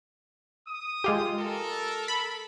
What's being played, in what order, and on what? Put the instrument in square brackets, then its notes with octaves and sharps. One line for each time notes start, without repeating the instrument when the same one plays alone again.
[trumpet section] D#6
[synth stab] G#3 F4 G4
[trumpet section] A4 A#4
[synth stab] B5